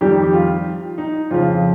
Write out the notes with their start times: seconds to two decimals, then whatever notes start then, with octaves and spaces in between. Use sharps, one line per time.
0.01 F2 D#3 G3 G4
0.23 G4
0.33 F4
0.98 D#4
1.31 F2 C#3 F3 F4